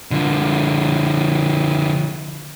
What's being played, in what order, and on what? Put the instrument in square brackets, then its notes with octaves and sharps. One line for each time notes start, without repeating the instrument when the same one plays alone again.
[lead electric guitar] D3 F3